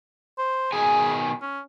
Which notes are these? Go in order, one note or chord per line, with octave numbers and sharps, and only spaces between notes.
C5
B2 D#3 G#4 G#5
C#4